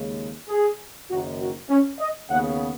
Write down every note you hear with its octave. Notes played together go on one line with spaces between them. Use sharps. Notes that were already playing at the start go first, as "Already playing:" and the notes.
Already playing: D#2 C#3 G#3
G#4
F#1 F#2 D#3 F#4
F#4
C#4
D#5
D#2 C#3 B3 F#5